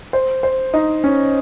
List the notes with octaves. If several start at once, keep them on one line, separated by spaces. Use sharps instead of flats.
C5
C5
D#4
C#4